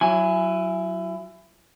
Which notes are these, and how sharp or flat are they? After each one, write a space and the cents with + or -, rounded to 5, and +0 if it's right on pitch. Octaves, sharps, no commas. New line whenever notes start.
F#3 +0 E4 +25 G#5 +0